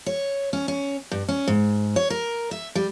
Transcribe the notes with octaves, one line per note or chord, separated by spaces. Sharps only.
C#5
C#4
C#4
G2
C#4
G#2
C#5
A#4
E5
G3